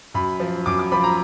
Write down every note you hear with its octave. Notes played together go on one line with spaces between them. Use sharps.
F#2 B5
F3
F#2 D6
D6
F3 B5
A#5